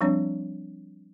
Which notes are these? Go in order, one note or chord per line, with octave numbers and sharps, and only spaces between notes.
F3 G3 C4 D4 C#5